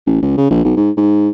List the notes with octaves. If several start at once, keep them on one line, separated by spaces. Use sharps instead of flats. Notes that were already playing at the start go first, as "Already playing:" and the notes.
A1
C#2
C#3
A#1
B1
G#2
G#2